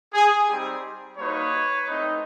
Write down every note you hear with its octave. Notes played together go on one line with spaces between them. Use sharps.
G#4
G3 C4 D#4 G4
G3 A#3 D#4 F#4 B4 C#5
A3 C4 D#4